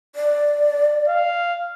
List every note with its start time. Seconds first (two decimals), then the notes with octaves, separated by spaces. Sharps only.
0.16 D5
1.08 F5